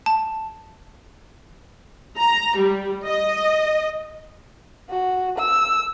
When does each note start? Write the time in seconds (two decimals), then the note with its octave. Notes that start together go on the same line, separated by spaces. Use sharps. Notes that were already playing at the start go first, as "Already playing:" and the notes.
0.06 A5
2.19 A#5
2.59 G3
3.06 D#5
4.90 F#4
5.38 E6